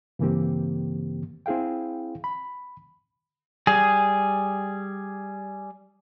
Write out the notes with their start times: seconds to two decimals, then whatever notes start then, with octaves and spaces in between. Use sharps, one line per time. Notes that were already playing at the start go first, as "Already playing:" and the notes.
0.19 G2 C#3 E3 A#3 C4 G4
1.46 C4 E4 G#4 F5 G5
2.24 B5
3.67 G3 G#4